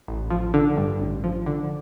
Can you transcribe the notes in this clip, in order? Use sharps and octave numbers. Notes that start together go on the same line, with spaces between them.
A1
F3
D3
G2
A1
F3
D3